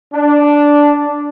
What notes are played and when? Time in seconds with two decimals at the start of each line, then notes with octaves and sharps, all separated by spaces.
0.13 D4